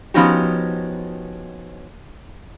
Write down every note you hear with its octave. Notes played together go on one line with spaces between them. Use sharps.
F3 B3 C#4 D#4 F#4 G4